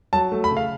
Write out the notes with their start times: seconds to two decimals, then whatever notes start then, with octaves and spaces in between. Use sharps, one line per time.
0.13 F#3 A5
0.32 A3
0.44 B5
0.51 C#3
0.57 F5